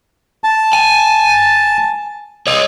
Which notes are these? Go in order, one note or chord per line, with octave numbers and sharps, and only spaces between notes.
A5
G#5
C#5 D#5